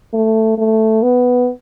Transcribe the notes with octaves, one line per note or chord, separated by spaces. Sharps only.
A3
A3
B3